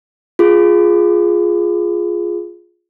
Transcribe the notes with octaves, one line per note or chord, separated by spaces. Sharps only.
F4 G#4